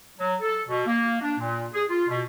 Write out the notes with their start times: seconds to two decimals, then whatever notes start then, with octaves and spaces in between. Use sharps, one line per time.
0.19 F#3
0.41 A4
0.68 B2
0.87 A#3
1.22 D4
1.39 A#2
1.74 G#4
1.89 F4
2.08 B2